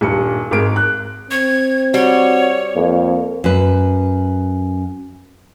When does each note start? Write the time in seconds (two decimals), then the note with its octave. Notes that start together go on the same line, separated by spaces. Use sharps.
0.01 D#1 G2 C#7
0.51 G#1 G#3 A#4 D7
0.76 F#6
1.31 C4 G#6
1.94 G3 F#4 C#5
2.76 F2 A#3
3.44 F#2 B4